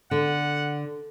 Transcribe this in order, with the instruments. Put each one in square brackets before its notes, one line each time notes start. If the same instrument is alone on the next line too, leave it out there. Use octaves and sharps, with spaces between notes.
[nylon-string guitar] D3 [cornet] F#5